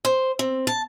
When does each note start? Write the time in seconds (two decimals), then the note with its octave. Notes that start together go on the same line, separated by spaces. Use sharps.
0.05 C5
0.39 C4
0.67 A5